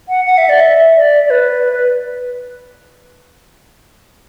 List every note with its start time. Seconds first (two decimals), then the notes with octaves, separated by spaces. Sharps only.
0.09 F#5
0.26 F#5
0.38 E5
0.49 D5
0.61 E5
0.96 D5
1.26 D5
1.30 B4